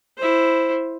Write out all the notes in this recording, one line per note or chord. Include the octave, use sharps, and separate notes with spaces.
E4 C5